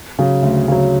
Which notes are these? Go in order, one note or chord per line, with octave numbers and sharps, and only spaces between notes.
C#3 F#3
D2
C#3 F#3